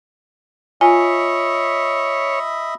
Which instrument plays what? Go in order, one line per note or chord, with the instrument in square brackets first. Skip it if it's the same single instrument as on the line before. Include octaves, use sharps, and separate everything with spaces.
[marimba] F4 [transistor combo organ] C#5 [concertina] D#5 E5 B5 [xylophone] G#5